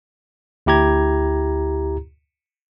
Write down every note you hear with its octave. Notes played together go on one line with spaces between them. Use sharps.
D2 E4 G4 A#5 G#6